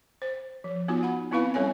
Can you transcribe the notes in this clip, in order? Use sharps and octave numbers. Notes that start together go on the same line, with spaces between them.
C5
F3
B3 D#4 F4 F#4
F#5 B5
B3 C4 E4 B4 F5 B5
G3 C#4 A4 C#5 G#5